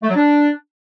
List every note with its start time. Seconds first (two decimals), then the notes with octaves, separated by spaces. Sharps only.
0.03 A3
0.09 F#3
0.15 D4